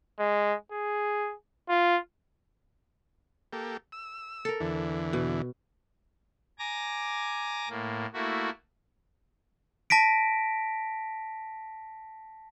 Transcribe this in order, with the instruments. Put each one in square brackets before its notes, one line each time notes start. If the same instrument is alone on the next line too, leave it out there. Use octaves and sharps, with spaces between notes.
[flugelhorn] G#3
G#4
F4
[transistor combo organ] A#3 G4 A4
E6
[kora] A4 A#4
[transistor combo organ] E2 D3 E3
[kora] B2
[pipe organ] G#5 A#5 D6 A#6
A2 A#3
A3 A#3 E4 F#4
[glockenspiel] A5 A#6 B6 D7